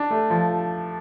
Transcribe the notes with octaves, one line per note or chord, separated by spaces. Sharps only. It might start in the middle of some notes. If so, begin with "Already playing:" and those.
Already playing: D4
A3
F3